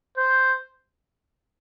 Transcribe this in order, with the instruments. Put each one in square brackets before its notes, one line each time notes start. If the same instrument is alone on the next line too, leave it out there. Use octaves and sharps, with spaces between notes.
[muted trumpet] C5